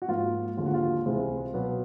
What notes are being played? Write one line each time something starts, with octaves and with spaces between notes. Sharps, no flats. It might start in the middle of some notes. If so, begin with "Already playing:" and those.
F#4
G#2 F3 A#3 F4
D#2 D3 F3 G#3 F4
F#4
F4
C#2 C3 E3 G#3 C4
B2 F#3 B3